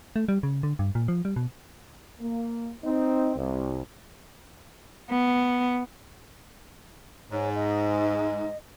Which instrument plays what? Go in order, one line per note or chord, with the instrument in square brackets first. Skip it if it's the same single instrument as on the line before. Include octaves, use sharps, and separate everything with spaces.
[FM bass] A3
G3
C#3
D3
G2
A#2
F3
G3
B2
[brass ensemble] A#3
C4 D#4
C2
[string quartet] B3
[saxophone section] G#2 [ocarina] C#5
[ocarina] D#5